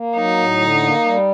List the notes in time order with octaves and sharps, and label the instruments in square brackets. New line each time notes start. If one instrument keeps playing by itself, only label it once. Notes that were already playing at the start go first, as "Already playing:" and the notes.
Already playing: [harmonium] A#3
[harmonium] F#3 [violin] D#4
[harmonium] A2
D3
A#3
G3